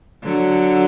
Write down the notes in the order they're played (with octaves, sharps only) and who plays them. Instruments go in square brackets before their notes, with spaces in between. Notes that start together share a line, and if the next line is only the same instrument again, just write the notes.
[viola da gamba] D3 F#3